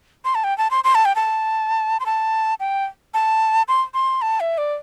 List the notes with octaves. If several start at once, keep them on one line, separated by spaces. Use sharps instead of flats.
C6
A5
G5
A5
C6
C6
A5
G5
A5
C6
A5
G5
A5
C6
C6
A5
E5
D5